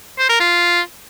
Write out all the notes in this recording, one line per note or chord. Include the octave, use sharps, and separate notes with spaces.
C5
A#4
F4